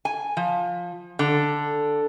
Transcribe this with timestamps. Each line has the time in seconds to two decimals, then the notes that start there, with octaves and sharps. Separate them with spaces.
0.05 G#5
0.37 F3
1.19 D3